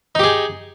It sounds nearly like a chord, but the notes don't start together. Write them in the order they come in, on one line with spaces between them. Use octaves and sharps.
D#4 G4 G#4